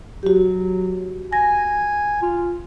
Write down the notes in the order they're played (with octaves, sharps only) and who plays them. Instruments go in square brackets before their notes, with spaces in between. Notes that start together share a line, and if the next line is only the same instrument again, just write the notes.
[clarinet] F#3 [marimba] F#4 G4
[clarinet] G#5 [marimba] A#6
[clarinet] F4